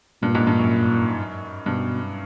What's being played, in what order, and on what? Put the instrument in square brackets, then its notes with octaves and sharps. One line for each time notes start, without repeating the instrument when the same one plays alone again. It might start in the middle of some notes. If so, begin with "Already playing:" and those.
[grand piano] G2 [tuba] A#2
[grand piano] G#2
G2
F#2
[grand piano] G2 [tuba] B2